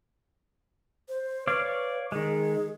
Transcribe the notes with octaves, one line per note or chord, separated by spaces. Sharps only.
C5
B4 C#5 D5 F5
D#3 G#3 G#4